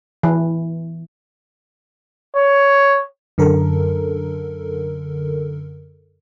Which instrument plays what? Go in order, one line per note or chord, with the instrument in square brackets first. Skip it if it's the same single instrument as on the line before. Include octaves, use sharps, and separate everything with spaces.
[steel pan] E3
[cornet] C#5
[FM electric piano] F#2 D3 A4 A#4